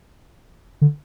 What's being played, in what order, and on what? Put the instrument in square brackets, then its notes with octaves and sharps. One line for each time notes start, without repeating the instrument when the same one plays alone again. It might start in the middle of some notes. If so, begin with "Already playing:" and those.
[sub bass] D3